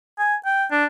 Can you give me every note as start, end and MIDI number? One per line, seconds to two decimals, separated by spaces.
0.19 0.35 80
0.46 0.65 79
0.71 0.85 62